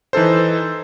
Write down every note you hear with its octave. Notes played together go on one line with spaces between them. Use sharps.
E3 D#4 A4 C5